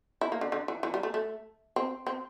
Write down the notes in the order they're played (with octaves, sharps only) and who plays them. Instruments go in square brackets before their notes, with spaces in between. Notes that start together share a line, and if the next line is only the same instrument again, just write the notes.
[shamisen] E4
A#3
D3
D3
E3
E3
G3
A3
A3
C4
C4